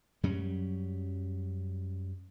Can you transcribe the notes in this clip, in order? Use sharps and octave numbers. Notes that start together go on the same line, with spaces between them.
F#2 F#3 G3 C#4